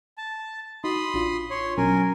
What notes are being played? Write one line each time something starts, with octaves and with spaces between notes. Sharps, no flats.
A5
D#4 F#4 B5 C6 D#6
A1 D4 F4
C#5 C6
B2 F#3 C#4 A#4 G#5